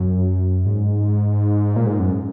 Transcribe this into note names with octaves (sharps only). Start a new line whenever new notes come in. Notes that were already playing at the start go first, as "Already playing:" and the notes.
Already playing: F#2
G#2
A#2
G#2
F#2